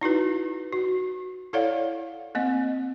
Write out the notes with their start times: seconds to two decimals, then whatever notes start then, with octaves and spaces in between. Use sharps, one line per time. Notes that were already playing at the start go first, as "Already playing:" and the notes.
0.01 D#4 E4 F#4 B4
0.73 F#4
1.53 E4 A4 C#5 D5 F5 F#5
2.35 A#3 C4 D#5